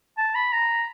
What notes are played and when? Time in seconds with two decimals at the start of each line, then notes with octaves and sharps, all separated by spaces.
0.18 A5
0.35 B5
0.53 A#5